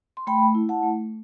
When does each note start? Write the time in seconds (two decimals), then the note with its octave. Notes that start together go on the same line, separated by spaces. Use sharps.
0.17 C6
0.27 A3 G5 B5
0.55 E4
0.69 F#5 A5
0.83 A3